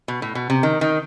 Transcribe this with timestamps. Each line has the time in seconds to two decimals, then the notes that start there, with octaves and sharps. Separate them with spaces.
0.08 B2
0.22 A2
0.35 B2
0.50 C3
0.63 D#3
0.81 D#3